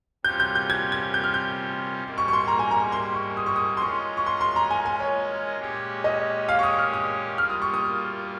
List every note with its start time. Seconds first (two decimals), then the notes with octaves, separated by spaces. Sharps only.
0.24 C3 G3 C#4 F4 G6
0.40 G6
0.55 G6
0.70 G#6
0.92 G#6
1.14 G6
1.24 F6
1.34 G6
2.03 G#2 G3 A#3
2.18 C#6
2.28 C#6
2.33 C6
2.48 A#5
2.59 G#5
2.71 A#5
2.92 C6
3.14 C#6
3.37 D#6
3.46 C#6
3.56 D#6
3.77 C6
3.81 G#3 C#4 F4 A#4 D#5 C#6
4.17 C#6
4.26 C6
4.41 C6
4.56 A#5
4.71 G#5
4.86 G#5
5.00 C#5
5.59 A#2 G#3 C#4 G4 C#5
6.04 D#5
6.49 F5
6.59 C#6
6.63 D#6
6.79 F6
6.93 D#6
7.38 G3 A#3 F4 F6
7.50 D#6
7.62 C#6
7.74 D#6